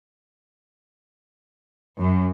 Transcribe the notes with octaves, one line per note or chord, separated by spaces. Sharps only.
F#2